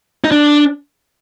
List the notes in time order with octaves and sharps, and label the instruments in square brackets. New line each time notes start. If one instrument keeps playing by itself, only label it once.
[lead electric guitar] D#4
D4